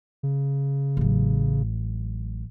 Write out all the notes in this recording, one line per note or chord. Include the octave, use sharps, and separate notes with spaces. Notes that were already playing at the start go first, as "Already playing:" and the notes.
C#3
A1 F#3